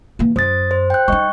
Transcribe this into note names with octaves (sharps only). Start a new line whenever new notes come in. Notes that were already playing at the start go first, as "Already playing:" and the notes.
E3 A#3
F#2 C5 D#6 A6
C5
G5 F#6
G3 D#4 D#5 C#6